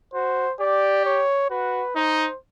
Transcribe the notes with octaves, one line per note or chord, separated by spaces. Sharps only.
F#4 C5
G4 D5
C#5
F#4 B4
D#4 C5